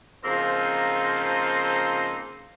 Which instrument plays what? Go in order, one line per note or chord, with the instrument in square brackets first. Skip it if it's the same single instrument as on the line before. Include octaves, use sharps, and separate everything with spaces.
[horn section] C#3 F3 A#3 C4 D#4 C5